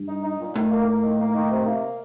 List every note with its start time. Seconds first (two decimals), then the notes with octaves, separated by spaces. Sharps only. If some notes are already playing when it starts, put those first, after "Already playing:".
Already playing: G2
0.08 D#4
0.24 D#4
0.40 A#2
0.56 A2 D#3
0.71 A#3
0.88 A#3
1.03 D#3
1.19 A#3
1.35 D#3
1.51 C3
1.66 A#3